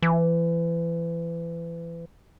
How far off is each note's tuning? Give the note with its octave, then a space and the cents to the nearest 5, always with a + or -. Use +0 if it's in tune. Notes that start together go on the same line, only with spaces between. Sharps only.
E3 +30